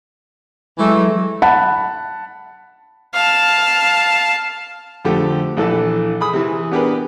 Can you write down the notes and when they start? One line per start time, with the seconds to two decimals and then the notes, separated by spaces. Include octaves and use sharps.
0.79 E3 F#3 G#3 A3
1.42 F#5 A5 B5
3.14 F5 A5
5.05 F2 D3 A3 G4
5.57 A#1 E3 A4 A5
6.21 G#4 B5 D#6
6.33 C3 E3
6.71 B3 D4 G4 G#4 A#4 B4